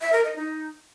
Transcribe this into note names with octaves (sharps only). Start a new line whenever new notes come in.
E5
A#4
D#5
D#4